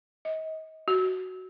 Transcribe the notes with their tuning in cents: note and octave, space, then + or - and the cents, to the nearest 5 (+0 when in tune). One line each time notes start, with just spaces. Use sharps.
D#5 +35
F#4 +10